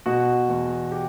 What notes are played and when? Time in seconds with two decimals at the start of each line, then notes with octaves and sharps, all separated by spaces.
0.06 B2 F#4
0.49 E2
0.92 G4